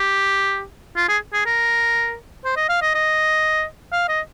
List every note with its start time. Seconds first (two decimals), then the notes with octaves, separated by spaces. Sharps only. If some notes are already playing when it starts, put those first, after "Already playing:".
Already playing: G4
0.96 F4
1.09 G#4
1.33 G#4
1.46 A#4
2.45 C5
2.57 D#5
2.69 F5
2.82 D#5
2.94 D#5
3.92 F5
4.09 D#5